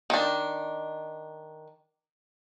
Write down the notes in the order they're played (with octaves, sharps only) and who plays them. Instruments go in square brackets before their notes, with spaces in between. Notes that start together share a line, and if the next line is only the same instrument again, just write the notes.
[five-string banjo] D#3 D4